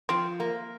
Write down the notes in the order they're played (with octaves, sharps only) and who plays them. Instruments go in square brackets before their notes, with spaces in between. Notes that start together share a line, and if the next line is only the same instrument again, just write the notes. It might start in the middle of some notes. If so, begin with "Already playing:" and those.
[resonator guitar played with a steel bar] F3 [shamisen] C4
[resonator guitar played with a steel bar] A#3